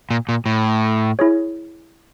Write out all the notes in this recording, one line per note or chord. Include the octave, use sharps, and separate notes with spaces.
A#2
A#2
A2
E4 G#4 C#5